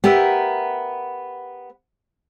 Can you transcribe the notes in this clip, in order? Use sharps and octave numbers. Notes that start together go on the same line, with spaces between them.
B3 G4 A#4 E5